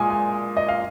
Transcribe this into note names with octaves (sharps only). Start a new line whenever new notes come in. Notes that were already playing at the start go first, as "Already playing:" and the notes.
Already playing: A#2 G#3 G#5 D#6
G#5
D#5
F5